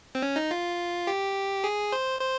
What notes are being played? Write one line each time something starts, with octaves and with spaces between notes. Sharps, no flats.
C4
C#4
D#4
F4
G4
G#4
C5
C5